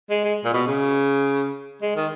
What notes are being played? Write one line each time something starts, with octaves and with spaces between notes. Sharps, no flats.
G#3
G#3
A#2
B2
C#3
G#3
D#3